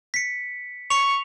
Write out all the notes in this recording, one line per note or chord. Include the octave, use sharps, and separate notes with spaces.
B6 C#7
C#6 C#7 F7